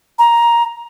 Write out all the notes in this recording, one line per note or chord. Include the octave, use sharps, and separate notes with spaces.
A#5